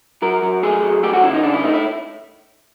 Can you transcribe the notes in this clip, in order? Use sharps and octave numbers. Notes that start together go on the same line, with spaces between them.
F#3 A#4
F#3
A3 G#4
F#3
A3 G4
F#4
C#3 E4
D#4
C#3 D4
E4
A3 D#4
E4